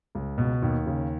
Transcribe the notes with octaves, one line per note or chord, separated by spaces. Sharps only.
C#2
B2
D#2
C#3